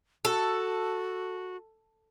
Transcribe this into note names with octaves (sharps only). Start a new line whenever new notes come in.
F#4 A4